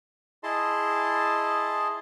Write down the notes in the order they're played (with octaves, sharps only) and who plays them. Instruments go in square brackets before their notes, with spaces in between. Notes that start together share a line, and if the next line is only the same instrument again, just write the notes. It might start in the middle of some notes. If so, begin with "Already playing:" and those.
[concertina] E4 G#4 D#5 A5 C6